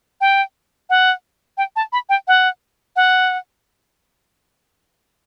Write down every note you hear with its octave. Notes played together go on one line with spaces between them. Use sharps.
G5
F#5
G5
A5
B5
G5
F#5
F#5